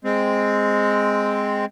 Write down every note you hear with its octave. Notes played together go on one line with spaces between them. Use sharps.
G#3 C4